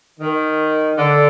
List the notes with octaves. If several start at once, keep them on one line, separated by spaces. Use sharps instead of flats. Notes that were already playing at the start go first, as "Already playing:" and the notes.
D#3
D3